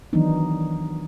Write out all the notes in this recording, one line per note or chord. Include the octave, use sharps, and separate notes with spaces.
D#3 E3 F#3 B3 D4 D#4